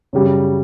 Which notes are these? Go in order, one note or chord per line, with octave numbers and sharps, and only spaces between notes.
F#2 C#3 G3